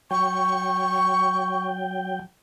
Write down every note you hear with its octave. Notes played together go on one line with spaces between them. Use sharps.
F#3 G5 C#6